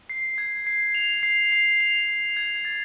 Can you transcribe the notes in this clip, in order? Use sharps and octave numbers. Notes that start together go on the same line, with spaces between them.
C7
G#6
C7
F7
C7
C7
F7
C7
G#6
A6